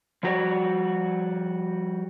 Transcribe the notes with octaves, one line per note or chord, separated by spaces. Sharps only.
F3 G3 F#4 G4 C#5 D5